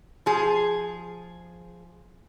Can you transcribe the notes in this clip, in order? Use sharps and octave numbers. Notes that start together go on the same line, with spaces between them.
F3 G#4